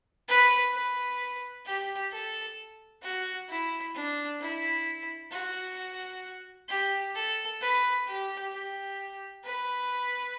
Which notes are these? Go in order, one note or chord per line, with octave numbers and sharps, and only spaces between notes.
B4
B4
G4
A4
F#4
E4
D4
E4
F#4
G4
A4
B4
G4
G4
B4